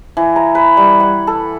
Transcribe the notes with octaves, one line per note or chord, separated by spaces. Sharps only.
E3
A#5
B4
G3
F#5
A4